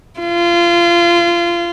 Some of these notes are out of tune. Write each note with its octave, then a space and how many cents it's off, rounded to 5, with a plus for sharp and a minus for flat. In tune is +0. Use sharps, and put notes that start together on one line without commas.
F4 -25